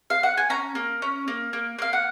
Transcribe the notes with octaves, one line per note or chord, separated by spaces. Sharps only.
F5
F#5
G#5
C#4 A#5
A#3
C#4
A#3
A#3
A#3 F5
F#5